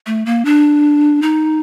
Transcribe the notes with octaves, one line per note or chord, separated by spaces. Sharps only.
A3
A#3
D4
D#4